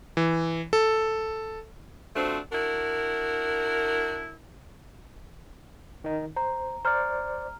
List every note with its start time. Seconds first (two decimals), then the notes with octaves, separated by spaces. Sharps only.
0.17 E3
0.73 A4
2.16 F3 A3 C4 D4 F#4
2.52 D4 E4 F#4 A#4
6.04 D#3 D#4
6.36 C5 A#5
6.85 C5 D5 A#5 F6